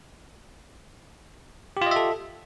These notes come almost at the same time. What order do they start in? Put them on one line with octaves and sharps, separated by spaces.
G4 F4 D#5 E5 A4